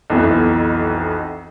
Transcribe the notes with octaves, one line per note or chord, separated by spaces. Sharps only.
B1 F2 E3 B3